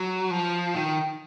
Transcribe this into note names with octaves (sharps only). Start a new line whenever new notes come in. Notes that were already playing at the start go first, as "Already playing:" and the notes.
Already playing: F#3
F3
D#3